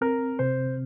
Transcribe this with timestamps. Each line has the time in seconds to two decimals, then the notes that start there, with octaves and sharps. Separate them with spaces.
0.01 C4 A#4
0.39 C3 C5